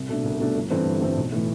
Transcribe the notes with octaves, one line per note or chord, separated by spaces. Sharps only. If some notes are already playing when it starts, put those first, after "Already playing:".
Already playing: C2
B2 A3 D4
C2
B2 A3 D4
G1
G2 E3 A3 C4
G1
G2 E3 A3 C4
B1
A2 E3